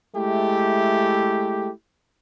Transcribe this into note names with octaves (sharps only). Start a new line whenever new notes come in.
G#3 A3 E4 G4